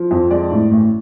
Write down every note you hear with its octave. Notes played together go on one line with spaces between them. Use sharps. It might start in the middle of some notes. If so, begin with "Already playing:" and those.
Already playing: F3
F2
G#3 D5
A2
A1